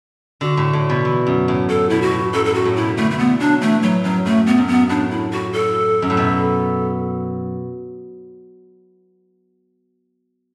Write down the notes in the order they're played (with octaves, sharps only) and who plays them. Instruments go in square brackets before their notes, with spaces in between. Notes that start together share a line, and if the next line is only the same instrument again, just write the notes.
[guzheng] D3 [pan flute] F#4
[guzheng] A2
A2
B2
E3
F#2
A2
[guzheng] A2 [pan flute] A4
[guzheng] B2 [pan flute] E4
[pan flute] F#4
[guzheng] A2
[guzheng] F#2 [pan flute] A4
[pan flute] A4
[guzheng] A2 [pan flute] F#4
[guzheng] A2
[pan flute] E4
[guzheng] B2
[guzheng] D3 [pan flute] A3
[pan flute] A3
[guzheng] E3 [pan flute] B3
[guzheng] F#3 [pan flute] D4
[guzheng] E3 [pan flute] A3
[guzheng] A2 [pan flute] F#3
[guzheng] F#2 [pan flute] F#3
[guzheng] A2 [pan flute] A3
[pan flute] B3
[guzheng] F#2
[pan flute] B3
[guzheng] A2 [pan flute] D4
[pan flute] E4
F#4
A4
[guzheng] F#2
A2
B2